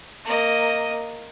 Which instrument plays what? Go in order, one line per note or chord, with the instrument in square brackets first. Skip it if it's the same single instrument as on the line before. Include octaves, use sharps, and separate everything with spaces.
[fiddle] A#3 D#5